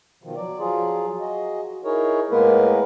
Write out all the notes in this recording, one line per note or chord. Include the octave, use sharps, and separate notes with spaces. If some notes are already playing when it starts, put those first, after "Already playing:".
B2 D#3 F3
F#3 D5
F3 F#3 F4 G#4
F#4 G#4 D#5
D#4 E4 G#4 A#4 C#5
A2 G#3 A#3 B3 A#4 B4